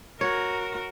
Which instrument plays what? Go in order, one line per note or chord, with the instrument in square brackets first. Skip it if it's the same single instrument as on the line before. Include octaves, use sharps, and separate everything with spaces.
[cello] F#4 [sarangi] A#4 [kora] C#5